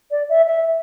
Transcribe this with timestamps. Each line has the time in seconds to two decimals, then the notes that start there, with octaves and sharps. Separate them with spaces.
0.11 D5
0.29 E5
0.47 E5